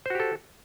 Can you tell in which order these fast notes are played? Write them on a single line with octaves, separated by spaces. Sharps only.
C5 F#4 G4 A4